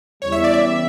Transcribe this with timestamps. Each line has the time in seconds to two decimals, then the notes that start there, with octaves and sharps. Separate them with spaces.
0.22 E2 C#3 G3 C#5
0.32 E5
0.44 D5
0.54 E5